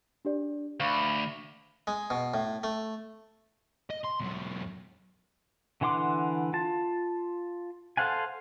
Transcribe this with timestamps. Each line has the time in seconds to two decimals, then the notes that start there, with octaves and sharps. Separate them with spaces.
0.25 D4 G4 D5
0.80 D2 F5 B5 C#6 D6
1.87 G#3
2.10 B2
2.34 A2
2.63 A3
3.90 D#5
4.04 C6
4.20 E2 F#3
5.81 D3 E3 F#5 C6 D6
6.53 F4 A5
7.97 A4 C5 F5 F#5 G#5